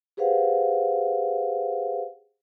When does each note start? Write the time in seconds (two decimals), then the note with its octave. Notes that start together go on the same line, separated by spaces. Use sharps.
0.17 G4 G#4 B4 C5 F5 F#5